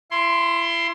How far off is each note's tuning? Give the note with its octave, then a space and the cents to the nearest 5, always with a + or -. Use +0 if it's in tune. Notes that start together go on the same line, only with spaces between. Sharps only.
E4 +35 C6 +0